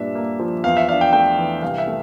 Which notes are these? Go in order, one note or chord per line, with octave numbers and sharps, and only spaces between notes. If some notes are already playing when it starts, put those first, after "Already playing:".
Already playing: G2 A#2 D4 E5
A#3
F3
E2 F5
E5
D4 F5
G5
A3 G5
E3
C2 F5
E5
A3